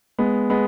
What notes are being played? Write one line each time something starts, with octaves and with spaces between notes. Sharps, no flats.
G#3 B3
G#3 B3